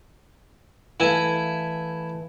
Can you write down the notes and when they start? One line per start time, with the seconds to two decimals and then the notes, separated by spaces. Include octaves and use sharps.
1.00 E3 A3 E4 E5 F5 G#5